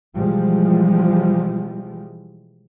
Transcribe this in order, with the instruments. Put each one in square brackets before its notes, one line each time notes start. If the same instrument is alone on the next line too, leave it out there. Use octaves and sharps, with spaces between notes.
[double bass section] B2 E3 F3 G3 G#3